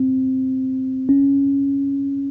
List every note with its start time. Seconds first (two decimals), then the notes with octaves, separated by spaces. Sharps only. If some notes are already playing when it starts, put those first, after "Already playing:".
Already playing: C4
1.09 C#4